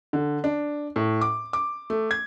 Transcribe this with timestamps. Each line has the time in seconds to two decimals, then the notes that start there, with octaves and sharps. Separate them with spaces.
0.13 D3
0.44 D4
0.96 A2
1.21 D6
1.53 D6
1.90 A3
2.11 G#6